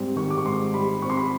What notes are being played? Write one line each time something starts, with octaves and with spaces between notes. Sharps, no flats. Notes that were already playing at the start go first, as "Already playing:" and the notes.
Already playing: G#2 G3 C4
D#3 C#6
D6
C#6
G#2 C6
G3 B5
C4 C#6
C6
B5